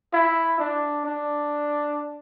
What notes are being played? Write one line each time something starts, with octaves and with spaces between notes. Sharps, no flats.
E4
D4
D4